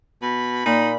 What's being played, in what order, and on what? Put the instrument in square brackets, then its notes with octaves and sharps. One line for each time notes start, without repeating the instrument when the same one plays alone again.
[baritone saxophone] B2 [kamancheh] B5
[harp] A#2 [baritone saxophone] D#4